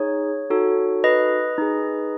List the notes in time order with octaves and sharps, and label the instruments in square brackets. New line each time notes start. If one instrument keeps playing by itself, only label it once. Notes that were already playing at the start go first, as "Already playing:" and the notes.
Already playing: [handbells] D#4 G#4 C#5
D#4 F#4 A4
B4 D#5
D#4 G#4